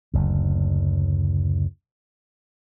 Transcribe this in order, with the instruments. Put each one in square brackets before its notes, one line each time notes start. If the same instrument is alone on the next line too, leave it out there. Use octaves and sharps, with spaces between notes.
[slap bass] F#1 D2